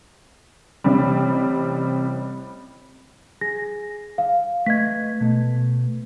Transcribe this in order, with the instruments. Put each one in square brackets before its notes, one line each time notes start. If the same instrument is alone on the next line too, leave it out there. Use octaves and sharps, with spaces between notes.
[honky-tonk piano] A1 C3 G3
[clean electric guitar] G#4 [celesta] A#6
[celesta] F5
[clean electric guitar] A3 B4 D#5 [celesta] G#6 B6
[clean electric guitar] B2 A3